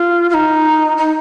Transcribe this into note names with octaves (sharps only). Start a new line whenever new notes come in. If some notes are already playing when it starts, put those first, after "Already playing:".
Already playing: F4
F4
D#4
D#4